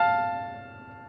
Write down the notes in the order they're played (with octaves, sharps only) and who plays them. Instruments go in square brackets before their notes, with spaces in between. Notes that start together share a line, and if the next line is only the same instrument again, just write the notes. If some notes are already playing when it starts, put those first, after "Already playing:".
Already playing: [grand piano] F5 A5